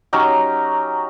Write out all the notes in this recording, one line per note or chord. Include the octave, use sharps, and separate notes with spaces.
F#3 C#4 D#4 G4